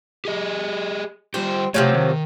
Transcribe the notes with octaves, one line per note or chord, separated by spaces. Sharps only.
G4 G#4 D#5
G3 C4 F4 G4
C3 F3 F#3 A3
D#3